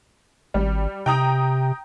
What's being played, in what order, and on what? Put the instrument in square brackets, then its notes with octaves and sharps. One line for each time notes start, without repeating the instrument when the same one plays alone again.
[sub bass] G#1 [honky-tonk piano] G3
[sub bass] C3 [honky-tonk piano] G5 A#5 D#6